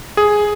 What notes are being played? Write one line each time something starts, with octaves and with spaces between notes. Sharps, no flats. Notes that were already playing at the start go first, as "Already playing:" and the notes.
G#4